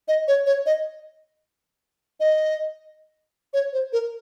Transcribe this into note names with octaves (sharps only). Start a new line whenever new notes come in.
D#5
C#5
C#5
D#5
D#5
C#5
C5
A#4